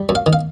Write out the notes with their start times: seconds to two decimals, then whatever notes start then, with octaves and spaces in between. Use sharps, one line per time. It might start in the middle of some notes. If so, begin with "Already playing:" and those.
Already playing: G3
0.09 F#2
0.15 F5
0.26 D#3
0.33 F5